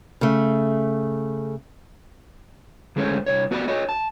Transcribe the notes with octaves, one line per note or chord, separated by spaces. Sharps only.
C#3 A3
D2 G#3 A3 C#4 C5
C2 C#5
B3 F#4 G4 D5 F5 B5
F#4 C#5 D#5
A5